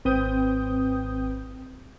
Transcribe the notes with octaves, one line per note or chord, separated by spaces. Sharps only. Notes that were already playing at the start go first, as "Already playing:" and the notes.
G#1 C4 B4 G5 D#6 G6